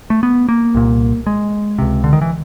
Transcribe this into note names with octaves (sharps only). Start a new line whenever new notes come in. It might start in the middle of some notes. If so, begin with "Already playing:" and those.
A3
B3
A#3
C2 A#2
G#3
C#2 C3
D3
D#3
E3